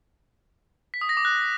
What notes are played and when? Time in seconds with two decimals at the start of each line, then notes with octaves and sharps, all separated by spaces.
0.94 B6
1.01 D#6
1.09 A#6
1.17 D6
1.25 F#6